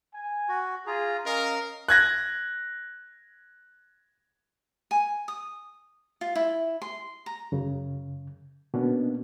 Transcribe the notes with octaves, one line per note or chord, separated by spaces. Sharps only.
G#5
F#4
F4 G#4 A#5
C#4 A#4 D#5 F5
F#6 G#6 A#6
G#5
D#6
F4
E4
C6
A#5
F#2 C#3
B2 A#3 B3 C#4 D4